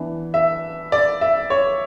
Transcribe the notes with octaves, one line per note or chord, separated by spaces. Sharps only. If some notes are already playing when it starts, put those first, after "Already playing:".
Already playing: E3 B3 D4
E5
D5
E5
C#5